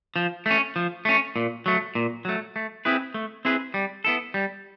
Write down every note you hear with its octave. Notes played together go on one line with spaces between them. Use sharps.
F3
A3 C#4
F3
A3 C#4
A#2
F#3 A3
A#2
F#3 A3
A3
C4 E4 G#4 B4
A3
C4 E4 G#4 B4
G3
B3 E4 A4
G3